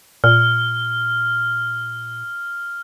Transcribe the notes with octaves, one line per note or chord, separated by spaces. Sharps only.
A#2 F6